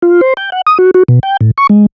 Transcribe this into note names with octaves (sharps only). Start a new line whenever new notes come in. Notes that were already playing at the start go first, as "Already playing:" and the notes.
F4
C5
G5
F#5
D#6
F#4
F#4
B2
G5
A2
C#6
G#3